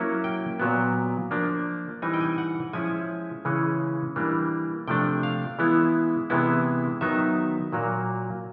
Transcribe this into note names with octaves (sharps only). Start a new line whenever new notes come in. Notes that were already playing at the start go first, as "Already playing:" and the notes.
Already playing: F#3 A#3 C#4 E4
G5
A#2 F#3 B3
F3 A#3 D4
E3 G3 C4 D#4 G#5
G5
G#5
F#5
F3 G#3 C#4 E4 G#5
C#3 E3 G#3 C#4
E3 G3 A#3 D4
C3 F3 A3 D4 G5
F5
E3 G#3 B3 E4
C3 E3 G#3 B3 E4
D#3 F#3 B3 D#4 E5
A#2 F#3 A#3